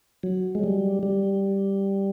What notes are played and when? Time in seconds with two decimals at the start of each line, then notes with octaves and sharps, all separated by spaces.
0.23 F#3
0.55 G#3
0.64 G3
1.03 G3